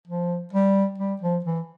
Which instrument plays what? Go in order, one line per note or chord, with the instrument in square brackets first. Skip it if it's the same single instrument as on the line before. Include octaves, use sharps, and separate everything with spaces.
[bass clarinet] F3
G3
G3
F3
E3